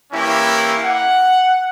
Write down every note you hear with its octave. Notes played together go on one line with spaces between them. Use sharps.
E3 A#3 C#4 E4 G4
F#5